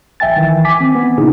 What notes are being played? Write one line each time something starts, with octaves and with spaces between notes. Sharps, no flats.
A1 E5 G5 G#5 A6
D#3 E3
G#5 D6 B6
C4
B3
A#2 C#3 D#4 E4 G#4